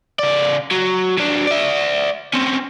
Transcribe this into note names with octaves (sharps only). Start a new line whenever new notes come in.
C#3 D5
F#3
F#3 D4
D5 E5
C4 C#4